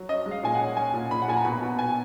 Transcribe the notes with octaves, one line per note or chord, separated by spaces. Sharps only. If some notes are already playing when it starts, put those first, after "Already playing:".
Already playing: F#3
C#4 D#5
G#3
F5
A#2 G#5
F#5
C#4
C#4 G#5
A#2
A#2 B5
F#5
A#2 G#5
A#5
B2 B5
B2
B2 G#5